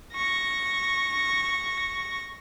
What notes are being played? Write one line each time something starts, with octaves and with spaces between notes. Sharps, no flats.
C#6 A#6